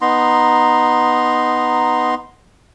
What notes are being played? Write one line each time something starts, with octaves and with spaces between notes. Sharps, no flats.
B3 D#4 A#5 C6